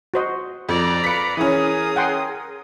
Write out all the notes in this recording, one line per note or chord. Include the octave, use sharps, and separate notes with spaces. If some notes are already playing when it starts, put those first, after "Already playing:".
F#4 C5 D#5
F2 D5 A#5
B4 F5 B6 C#7
E3 C#4 G#4 A#4 D#6
F#5 G5 C6